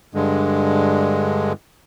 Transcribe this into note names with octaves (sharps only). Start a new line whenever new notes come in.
G2 D3 G#3